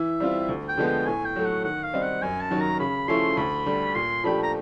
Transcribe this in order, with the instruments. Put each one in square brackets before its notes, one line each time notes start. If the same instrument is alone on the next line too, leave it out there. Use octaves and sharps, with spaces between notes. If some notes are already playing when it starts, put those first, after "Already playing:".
Already playing: [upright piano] E3 [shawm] E5
[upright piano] G3 C4 F4
D2
[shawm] G5
[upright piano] D3 F3 G#3 B3
[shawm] G5
[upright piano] A2 [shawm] G#5
[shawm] G5
[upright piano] F#3 A3
[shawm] F#5
[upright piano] D#3 [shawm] F#5
[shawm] F5
[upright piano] G3 C4 D#4
[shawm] F#5
[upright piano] F#2 [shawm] G#5
[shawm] A5
[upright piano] D#3 F#3
[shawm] A#5
[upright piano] C#3 [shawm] B5
[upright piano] F3 A3 C#4 E4 [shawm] C6
[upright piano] D2 [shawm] B5
[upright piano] D3 G3
[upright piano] A#2 [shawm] C6
[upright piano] F3 A3 D4 G4 [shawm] B5
[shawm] A#5